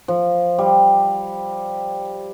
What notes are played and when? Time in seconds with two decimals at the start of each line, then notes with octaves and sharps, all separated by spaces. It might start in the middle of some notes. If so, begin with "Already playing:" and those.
0.08 F3
0.59 G3